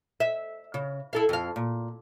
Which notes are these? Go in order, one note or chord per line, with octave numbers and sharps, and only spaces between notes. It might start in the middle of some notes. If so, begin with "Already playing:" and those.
E5
C#3
E4 A4 F5
F2 F5
A#2